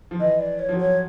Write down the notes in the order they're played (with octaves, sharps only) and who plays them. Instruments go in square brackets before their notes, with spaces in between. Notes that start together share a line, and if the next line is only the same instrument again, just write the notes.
[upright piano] F3
[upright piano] E3 [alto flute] D#5
[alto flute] D5
C#5
[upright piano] F3
F#3
[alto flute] C#5